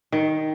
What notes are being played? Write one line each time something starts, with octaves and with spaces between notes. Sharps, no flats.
D#3